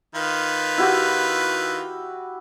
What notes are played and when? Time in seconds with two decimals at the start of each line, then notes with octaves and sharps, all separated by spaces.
0.15 D#3 F4 B4
0.78 E4 F#4 G4